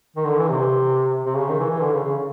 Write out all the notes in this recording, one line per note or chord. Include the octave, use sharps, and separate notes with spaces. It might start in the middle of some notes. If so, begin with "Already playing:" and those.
D#3
D3
E3
C3
C3
C#3
D#3
E3
E3
D3
C#3
C#3